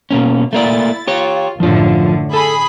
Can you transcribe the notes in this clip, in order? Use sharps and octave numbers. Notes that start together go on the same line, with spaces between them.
B2 A#3 C#4
A3 A#3 E4 D5 A6
F4 G4 C#5
F#2 A2 D3 F3 F4
G#4 A4 B5 D#6